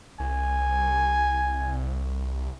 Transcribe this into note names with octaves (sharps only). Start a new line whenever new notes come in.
C2 G#5